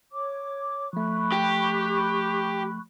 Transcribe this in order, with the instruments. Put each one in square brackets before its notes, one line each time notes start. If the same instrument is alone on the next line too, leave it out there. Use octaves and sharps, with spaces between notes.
[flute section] C#5 D6
[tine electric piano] F3 A3 [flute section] B5 C#6 F#6
[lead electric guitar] G4